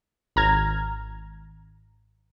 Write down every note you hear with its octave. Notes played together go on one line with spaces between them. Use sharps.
G#1 A#5 F6 G#6